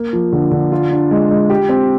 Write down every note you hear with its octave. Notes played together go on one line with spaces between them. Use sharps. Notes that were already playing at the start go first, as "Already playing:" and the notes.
Already playing: A#3
F3
D3
D3
F4
D4
G#3
G#3
G4
C4